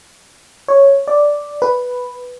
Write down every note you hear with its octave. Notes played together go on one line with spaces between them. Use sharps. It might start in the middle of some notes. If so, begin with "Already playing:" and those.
C#5
D5
B4